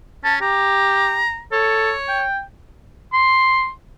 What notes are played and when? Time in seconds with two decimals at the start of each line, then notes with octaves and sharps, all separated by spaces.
0.24 C#4 A5
0.41 G4 A#5
1.52 A4 C#5
2.09 G5
3.13 C6